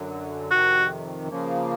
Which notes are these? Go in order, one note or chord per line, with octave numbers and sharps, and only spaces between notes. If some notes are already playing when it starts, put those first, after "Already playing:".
Already playing: F#2 D3 F#3
F2 C3 D#3 F#4
C#3 F3 A#3